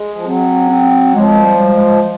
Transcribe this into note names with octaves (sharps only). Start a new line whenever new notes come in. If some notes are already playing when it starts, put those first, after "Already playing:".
Already playing: G#3
F3
F#3 C4
C4
F3 G#3
G3
G#3